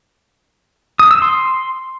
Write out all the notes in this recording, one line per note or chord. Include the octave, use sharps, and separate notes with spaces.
D#6
E6
C6